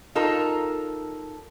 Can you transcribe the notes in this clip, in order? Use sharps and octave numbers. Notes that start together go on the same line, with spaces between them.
D#4 F4 A4 A#4